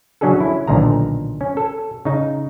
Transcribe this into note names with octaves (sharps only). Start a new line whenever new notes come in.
C#3 F#3 C#4 D4 G#4 A4
C#4 E4
B1 A#2 D3 D#3 A#5
C#4
A4
C#3 D#4